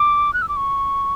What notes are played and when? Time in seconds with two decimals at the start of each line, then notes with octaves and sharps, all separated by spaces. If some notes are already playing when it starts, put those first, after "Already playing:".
Already playing: D6
0.33 F#6
0.42 E6
0.48 D6
0.56 C#6